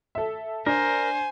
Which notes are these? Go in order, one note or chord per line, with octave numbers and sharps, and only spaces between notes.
A4 E5
D4 A#4 C5 G#5